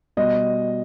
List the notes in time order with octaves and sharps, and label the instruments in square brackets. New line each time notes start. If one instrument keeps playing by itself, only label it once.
[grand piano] B2 G3 D#5